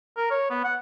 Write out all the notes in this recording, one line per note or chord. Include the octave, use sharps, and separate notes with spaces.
A#4
C#5
B3
F#5